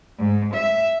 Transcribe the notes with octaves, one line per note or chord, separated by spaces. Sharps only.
G#2
E5